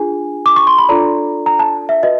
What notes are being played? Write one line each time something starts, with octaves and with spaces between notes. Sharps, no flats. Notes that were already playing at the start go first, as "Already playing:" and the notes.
Already playing: D4 F4 G#4 G#5
D6
C#6
C6
B5
D4 F4 A4 D5 A#5
A#5
A5
E5
F#4 B4 D#5